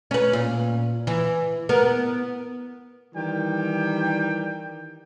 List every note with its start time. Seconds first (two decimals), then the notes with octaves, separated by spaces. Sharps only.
0.11 C#4 B4
0.33 A#2
1.07 E3
1.69 B3 A#4
3.14 D#3 E3 G3 G5